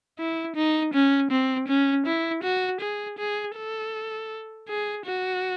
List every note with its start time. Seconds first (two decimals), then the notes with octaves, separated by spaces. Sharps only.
0.19 E4
0.56 D#4
0.94 C#4
1.31 C4
1.68 C#4
2.06 E4
2.43 F#4
2.81 G#4
3.19 G#4
3.57 A4
4.69 G#4
5.06 F#4